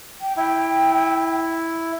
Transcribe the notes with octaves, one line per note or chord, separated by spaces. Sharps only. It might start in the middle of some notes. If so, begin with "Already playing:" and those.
G5
E4 G5